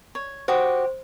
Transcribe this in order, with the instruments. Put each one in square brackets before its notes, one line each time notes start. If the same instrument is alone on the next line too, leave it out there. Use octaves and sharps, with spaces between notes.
[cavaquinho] C#5
[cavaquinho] F#4 G4 D#6 [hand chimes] C5